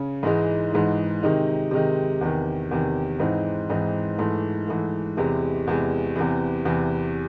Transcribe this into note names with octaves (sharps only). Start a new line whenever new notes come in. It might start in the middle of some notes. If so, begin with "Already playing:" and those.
Already playing: C#3 C#4
G#2 E3 G#3 D#4
G#2 E3 G#3 D#4
C3 D#3 G#3 D#4
C3 D#3 G#3 D#4
E2 C3 D#3
E2 C3 D#3
G#2 E3 C4 D#4
G#2 E3 C4 D#4
G#2 E3 A3
G#2 E3 A3
E2 C3 E3 G#3
E2 C3 E3 G#3
E2 C3 E3
E2 C3 E3